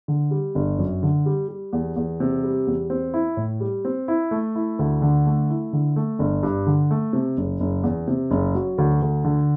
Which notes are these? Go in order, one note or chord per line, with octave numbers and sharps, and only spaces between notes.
D3
G3
G1
F#2
D3
G3
G3
E2
E2
C3
G3
E2
C4
E4
A2
G3
C4
E4
A3
E4
D2
D3
A3
E4
D3
A3
G1
G2
D3
A3
C3
F#1
F#1
E2
C3
F#1
F#3
D2
D2
D3